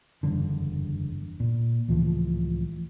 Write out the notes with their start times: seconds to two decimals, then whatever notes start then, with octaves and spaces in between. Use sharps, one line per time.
0.23 F#1 E2 G2 D3
1.40 A#2
1.88 C#2 A2 E3 F3